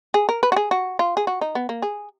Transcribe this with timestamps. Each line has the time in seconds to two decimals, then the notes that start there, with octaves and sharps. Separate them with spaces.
0.14 G#4
0.29 A#4
0.43 B4
0.52 F#4
0.56 G#4
0.71 F#4
0.99 F4
1.17 G#4
1.27 F#4
1.41 D#4
1.55 B3
1.69 A#3
1.82 G#4